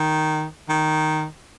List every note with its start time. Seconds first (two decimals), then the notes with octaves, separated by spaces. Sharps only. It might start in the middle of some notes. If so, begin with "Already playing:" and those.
Already playing: D#3
0.69 D#3